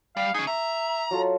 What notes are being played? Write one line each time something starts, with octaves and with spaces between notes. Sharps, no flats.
G3 F5
C#4 D#4 G#4
E5 A#5
F#3 F4 A4